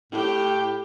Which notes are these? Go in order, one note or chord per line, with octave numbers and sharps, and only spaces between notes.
A2 G4 G5